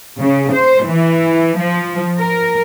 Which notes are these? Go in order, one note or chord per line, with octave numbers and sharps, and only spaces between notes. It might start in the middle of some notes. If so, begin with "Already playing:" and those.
C#3
C5
E3
F3
A#4